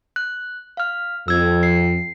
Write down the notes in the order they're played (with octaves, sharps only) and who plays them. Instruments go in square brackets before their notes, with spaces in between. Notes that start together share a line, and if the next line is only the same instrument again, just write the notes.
[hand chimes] F#6
F5 F6
[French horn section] F2 [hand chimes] E6 G#6
[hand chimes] C7